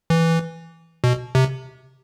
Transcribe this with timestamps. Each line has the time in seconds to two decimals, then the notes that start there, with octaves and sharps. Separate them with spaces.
0.10 E3
1.04 B2
1.35 C3